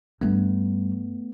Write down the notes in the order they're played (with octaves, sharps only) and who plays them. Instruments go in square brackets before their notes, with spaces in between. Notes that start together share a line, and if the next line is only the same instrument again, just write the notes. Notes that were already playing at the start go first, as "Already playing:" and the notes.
[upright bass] G2 G3 [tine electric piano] A3 B3